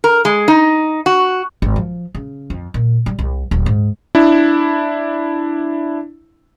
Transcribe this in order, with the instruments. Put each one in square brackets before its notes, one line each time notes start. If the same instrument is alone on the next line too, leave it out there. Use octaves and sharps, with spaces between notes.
[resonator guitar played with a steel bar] A#4
G#3
D#4
F#4
[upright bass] G#1
F3
C#3
F2
A#2
G3
C2
D1
G#2
[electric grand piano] D4 E4